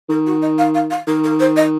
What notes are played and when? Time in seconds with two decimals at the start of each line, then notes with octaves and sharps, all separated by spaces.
0.09 D#3 A#4
0.26 F#4
0.42 D#5
0.58 F5
0.75 F5
0.90 F5
1.07 D#3 A#4
1.24 A#4
1.39 C5
1.56 D#5